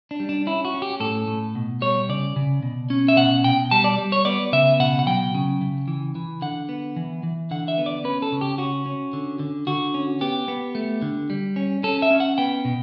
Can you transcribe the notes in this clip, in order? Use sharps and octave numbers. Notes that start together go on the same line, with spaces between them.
D4
G3
D4
C#4 E4
F#4
C#4
G4
A2 A4
A2
B2
G3 C#5
C#3 D5
C#3
B2
C#4
E5
B2 F#5
B2 G5
G3 A5
D5
G3
C#5
B3 D5
C#3 E5
B2 F#5
F#5
F#3 G5
C#3
C#3
E3
E3
D3 F#5
B3
E3
E3
D3 F#5
E5
B3
D5
C#4 B4
A4
C#3
G4
C#4 F#4
C#4
D3
D3
D3 F#4
C#4
B3 G4
B3
A3
D3
G3
C#4
C#4 A4
E5
C#4
F#5
B3 G5
B2